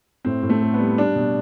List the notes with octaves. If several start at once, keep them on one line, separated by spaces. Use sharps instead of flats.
A2 C4
A2
A3
A2
B3
G3
G3 D4
B2